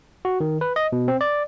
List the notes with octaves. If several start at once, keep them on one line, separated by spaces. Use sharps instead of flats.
F#4
D#3
B4
D#5
B2
C4
D5